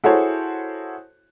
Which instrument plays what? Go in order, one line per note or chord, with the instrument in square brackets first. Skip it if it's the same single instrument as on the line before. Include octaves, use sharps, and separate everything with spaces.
[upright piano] E4 F#4 G#4 A4 C5 C#5